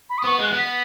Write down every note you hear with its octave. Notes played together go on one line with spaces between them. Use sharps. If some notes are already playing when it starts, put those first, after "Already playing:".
B5
D#6
B3 C#6
G#3 F#6
B3
B6